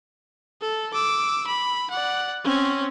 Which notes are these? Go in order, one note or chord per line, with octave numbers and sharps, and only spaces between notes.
A4
D6 E6
B5
D5 F#5
C4 C#4